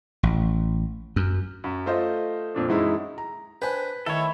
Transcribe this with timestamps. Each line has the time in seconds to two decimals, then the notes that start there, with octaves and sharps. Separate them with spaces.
0.23 A1
1.16 F#2
1.64 F#2
1.86 A3 F4 C5 D#5
2.55 F2 A#2 D4
2.68 F#2 E3 G#3 D#4 E4
3.18 A#5
3.62 D4 B4 C5 G5 G#5
4.06 D#3 A3 E4 A4 C#5